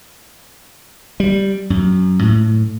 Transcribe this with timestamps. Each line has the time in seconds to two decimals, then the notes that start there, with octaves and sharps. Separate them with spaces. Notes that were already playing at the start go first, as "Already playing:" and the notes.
1.20 G3
1.70 F#2
2.23 A2